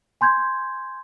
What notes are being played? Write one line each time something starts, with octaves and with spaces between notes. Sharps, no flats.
G#5 C6 G6 G#6